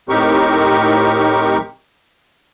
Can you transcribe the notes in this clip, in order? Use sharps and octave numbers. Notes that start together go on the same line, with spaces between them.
A2 C4 D#4 G4 A#4 C#6